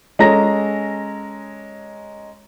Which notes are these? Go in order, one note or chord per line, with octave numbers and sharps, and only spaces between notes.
G#3 C#4 A4 A#5 A#6